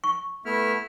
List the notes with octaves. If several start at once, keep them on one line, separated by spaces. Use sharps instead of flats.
C#6
A3 B3 E4 F6